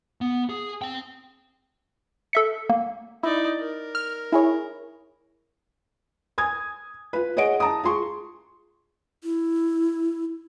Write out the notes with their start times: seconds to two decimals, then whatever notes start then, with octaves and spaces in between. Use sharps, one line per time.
0.21 B3
0.49 G#4
0.82 C4 G5
2.33 A4 E5 C#7
2.70 A#3
3.23 D#4 E4 D5
3.60 A#4
3.95 F6
4.32 E4 G#4 C#5
6.38 G#5 D#6 G#6
7.13 F4 B4
7.37 G#4 C#5 D#5 F#5 D7
7.60 A5 A#5 D#6
7.83 F4 G#4 C6 C#6
9.24 E4